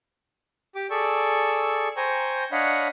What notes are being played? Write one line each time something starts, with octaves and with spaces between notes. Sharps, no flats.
G4 D6
G#4 A4 D5 C#6 E6
C5 G5 G#5 A#5 C#6
D4 C#5 D#5 F5 F#5 B5